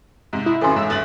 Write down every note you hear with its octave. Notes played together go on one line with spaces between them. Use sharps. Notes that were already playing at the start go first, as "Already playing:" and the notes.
G#2 C3
E4 D#6
F#2 A2 C#3 E3 A4 G#5 C6
G#2 E6
G1 A3 G#4 A6 F#7